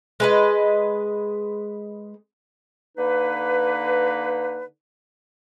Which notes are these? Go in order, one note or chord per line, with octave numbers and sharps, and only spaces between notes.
G#3 B4 D#5
D3 A#3 D#4 B4